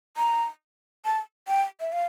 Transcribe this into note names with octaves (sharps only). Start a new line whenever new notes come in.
A#5
A5
G5
E5
F5